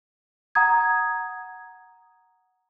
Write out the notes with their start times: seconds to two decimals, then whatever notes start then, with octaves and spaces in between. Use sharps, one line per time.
0.55 F#5 A#5 D#6 G#6